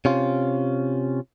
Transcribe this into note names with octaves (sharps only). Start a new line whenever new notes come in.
C3 C#4 F4